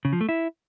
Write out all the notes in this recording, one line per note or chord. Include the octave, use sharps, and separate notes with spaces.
C#3
F3
A3
E4